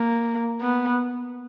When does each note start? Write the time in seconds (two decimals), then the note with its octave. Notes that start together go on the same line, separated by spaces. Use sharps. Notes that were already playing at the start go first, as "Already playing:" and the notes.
Already playing: A#3
0.61 B3